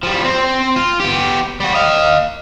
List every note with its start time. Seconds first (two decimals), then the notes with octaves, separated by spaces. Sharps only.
0.03 F3 G3
0.24 C4
0.76 F4
1.00 B3 G4
1.60 G3 F#4
1.74 D#5 F5